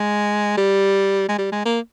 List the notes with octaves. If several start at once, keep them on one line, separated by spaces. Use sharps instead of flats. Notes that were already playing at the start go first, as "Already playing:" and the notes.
Already playing: G#3
G3
G#3
G3
G#3
A#3